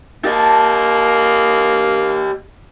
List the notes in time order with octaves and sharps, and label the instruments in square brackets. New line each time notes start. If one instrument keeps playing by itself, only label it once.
[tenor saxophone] A#3 [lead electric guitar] G4 D#5 [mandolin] A5